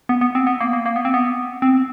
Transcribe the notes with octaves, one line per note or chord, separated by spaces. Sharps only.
B3
B3
C4
B3
A#3
A#3
A#3
B3
C4
B3
C4